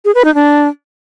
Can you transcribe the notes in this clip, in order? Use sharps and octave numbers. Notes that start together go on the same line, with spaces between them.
G#4
B4
D#4
D4